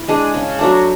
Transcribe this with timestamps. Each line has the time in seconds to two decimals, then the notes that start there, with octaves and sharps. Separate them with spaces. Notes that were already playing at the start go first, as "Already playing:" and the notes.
Already playing: E4
0.08 G#3 D4 G#4
0.34 C#3
0.59 F#3 A3 D4